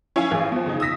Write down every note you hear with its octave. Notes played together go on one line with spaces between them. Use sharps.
C#4 E4 F5 G#5
A1 G#4
B2 F3
C#3 D#4
D#6 E6 A#6 B6